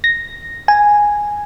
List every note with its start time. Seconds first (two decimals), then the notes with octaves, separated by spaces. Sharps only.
0.04 A#6
0.68 G#5